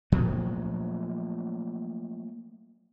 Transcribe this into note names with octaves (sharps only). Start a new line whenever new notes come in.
A#2 F3 F#3 A3